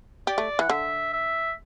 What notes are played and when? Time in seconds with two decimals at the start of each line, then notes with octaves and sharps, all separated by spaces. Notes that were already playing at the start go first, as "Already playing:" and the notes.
0.27 G4 D5
0.38 A3
0.59 E3 F#5
0.70 D3 E5
1.13 E5